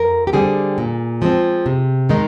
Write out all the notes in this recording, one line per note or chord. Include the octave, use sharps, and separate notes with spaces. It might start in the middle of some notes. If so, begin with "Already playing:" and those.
Already playing: F2 A#4
G4
D3 G3 C4 G#4
A#2
F3 G#3 C4
C3
D#3 G#3 D#4